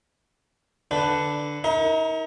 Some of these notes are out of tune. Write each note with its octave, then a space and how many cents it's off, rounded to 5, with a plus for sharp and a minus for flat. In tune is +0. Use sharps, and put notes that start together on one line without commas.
D3 +0 D4 +0 B4 +10
D#4 +45 A#4 +0 D#5 +45